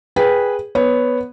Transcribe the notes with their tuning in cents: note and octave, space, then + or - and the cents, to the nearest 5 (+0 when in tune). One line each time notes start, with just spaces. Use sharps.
G#4 -10 B4 -10 G5 +0
B3 +0 C#5 +5